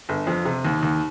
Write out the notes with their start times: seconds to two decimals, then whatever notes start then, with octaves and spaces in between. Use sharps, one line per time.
0.09 G1
0.27 F2
0.45 C3
0.65 D#2
0.83 D#2